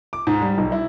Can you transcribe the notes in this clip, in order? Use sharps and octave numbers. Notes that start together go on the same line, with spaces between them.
D6
G#2
G3
B1
E4